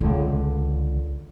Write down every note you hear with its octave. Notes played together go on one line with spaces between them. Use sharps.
C#2 D3